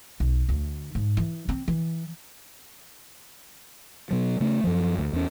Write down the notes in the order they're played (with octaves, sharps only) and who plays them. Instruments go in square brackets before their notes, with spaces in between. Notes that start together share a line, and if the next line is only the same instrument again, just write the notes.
[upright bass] B1
D2
G#2
E3
C4
E3
[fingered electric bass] B2 F#3
C#3 A3
F#2 F3
D2
E2 C#4